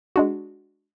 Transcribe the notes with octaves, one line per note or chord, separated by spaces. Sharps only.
G#3 D4 F#4